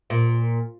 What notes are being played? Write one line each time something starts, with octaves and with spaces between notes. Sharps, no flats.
A#2